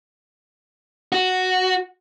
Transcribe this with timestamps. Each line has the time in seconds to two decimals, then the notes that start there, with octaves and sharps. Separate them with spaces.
1.12 F#4